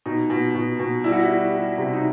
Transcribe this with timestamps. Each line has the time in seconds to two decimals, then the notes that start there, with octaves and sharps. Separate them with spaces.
0.06 B2 D#4
0.30 B2
0.55 B2
0.79 B2
1.04 G3 E4
1.12 F#4
1.20 E4
1.30 G3
1.54 G3
1.78 C3
1.93 D#4